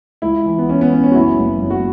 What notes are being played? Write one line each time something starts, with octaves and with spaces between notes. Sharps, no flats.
C#2 E4
E3
B3
E3 C#4
B3
C#2 C#4
C#4
F#4
F#1 E4
F#1
F#2
F#4